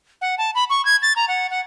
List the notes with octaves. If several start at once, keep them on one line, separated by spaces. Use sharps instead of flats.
F#5
A5
B5
C#6
G#6
A6
A#5
F#5
F#5